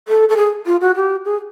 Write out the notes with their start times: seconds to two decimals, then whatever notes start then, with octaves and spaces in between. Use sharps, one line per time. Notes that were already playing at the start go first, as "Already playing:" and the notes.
0.08 A4
0.29 A4
0.37 G#4
0.66 F4
0.81 F#4
0.95 G4
1.25 G#4